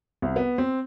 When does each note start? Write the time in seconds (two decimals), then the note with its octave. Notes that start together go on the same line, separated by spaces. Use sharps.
0.22 C2
0.36 B3
0.58 C4